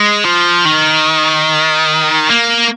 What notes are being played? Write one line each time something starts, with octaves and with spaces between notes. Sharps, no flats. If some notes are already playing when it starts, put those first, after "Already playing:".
Already playing: G#3
F3
D#3
A#3